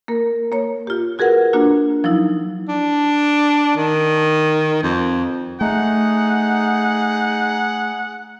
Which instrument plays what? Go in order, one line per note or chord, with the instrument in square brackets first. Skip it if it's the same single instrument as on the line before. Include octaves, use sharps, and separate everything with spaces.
[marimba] A#3 A#4
A#3 C#5
F4 G4
F4 F#4 G#4 A#4 B4 F#5
A#3 D4 F4 F#4
F3 F#3 D#4 E4
[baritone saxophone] D4
D#3
F2
[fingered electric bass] A3 [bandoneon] D#4 [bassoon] G#4 [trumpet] F#5